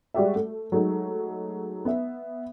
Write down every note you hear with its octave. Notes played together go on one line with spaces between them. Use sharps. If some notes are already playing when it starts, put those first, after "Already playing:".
G3 G#3 F#4 G4 D5 E5
A3
F#3 G#3 A3 D#4
B3 E5